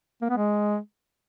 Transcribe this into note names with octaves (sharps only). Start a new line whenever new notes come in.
A#3
B3
G#3